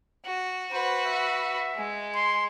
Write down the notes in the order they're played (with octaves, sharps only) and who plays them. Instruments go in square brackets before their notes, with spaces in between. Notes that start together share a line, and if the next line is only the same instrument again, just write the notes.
[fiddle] F#4
[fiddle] F#4 B4 [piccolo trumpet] C5
[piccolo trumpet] E5
[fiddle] G#3
[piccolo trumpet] C6